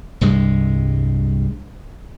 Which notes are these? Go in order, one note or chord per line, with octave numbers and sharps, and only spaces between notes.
C2 G2 G#3